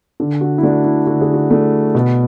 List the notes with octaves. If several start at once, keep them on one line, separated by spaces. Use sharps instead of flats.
D3
F#4
E4
A3 D4 F#4
E4
D3 F#4
G#4
F#4
A3 D4
B2 F#4